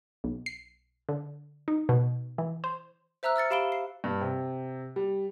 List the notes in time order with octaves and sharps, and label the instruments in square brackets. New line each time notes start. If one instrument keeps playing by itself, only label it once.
[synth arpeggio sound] B1
C7
D3
D#4
B2
E3
C5
[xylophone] C5 E5 A#5 E6 F#6
E6 F6 A6 C#7
G4 F5 B5 D7 E7 G7
C7
[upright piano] G2
C3
G3